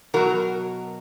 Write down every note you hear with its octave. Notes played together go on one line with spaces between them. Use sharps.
B2 F#3 F#4 A#4